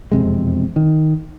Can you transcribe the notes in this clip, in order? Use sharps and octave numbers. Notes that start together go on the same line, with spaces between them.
E1 F2 C3 G#3
D#3